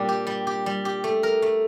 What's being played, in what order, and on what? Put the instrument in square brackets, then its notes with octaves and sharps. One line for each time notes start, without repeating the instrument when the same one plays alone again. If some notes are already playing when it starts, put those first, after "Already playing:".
Already playing: [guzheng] A#2 G3 D4
G4
G3
G4
G3
G4
A3
A#4
A3